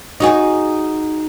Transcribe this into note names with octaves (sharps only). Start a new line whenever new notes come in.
D#4 F#4 G#4